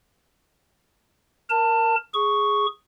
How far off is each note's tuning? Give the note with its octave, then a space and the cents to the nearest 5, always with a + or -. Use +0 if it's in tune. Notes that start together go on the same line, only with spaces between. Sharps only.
A#4 +0 A5 +25
G#4 +0 C#6 +0